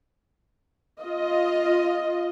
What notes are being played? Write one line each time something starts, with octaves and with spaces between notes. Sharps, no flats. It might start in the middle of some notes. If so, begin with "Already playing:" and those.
F4 D#5